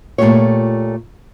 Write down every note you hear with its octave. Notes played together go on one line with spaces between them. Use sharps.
A#2 A3 D#4 F4 G4 C#5